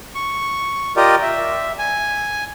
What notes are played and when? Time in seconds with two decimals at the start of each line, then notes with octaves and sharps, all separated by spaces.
0.15 C#6
0.97 F4 G4 A#4 D5 D#5
1.22 E5
1.79 G#5